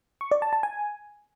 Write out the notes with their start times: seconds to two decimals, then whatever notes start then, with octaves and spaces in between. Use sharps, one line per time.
0.21 C#6
0.31 D5
0.42 A5
0.53 A5
0.63 G#5